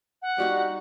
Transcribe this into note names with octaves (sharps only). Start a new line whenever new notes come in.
F#5
G3 D#4 F#4 D5